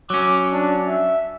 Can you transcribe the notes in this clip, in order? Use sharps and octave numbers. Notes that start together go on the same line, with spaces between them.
F#3 C#4 D6
D4
E5